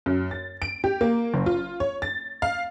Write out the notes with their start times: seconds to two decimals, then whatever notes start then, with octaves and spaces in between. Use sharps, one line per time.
0.06 F#2
0.31 A6
0.62 D7
0.84 G4
1.01 A#3
1.34 F#1
1.46 F4
1.80 C#5
2.02 A6
2.42 F5